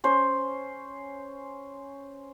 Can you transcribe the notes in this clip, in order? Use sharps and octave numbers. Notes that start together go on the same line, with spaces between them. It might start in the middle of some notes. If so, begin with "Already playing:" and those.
C#4 C5